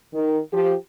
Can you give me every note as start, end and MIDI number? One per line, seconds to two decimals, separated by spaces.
0.13 0.39 51
0.52 0.73 53
0.52 0.73 67